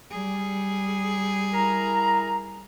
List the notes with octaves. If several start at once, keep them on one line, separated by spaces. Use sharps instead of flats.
G3 G#4
E4 A#4 A#5